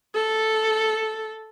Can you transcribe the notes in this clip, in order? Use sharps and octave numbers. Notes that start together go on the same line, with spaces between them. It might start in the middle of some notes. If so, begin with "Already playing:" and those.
A4